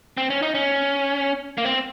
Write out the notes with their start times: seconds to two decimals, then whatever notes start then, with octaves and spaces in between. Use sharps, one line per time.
0.17 C4
0.30 C#4
0.42 D#4
0.55 C#4
1.58 A#3
1.65 C4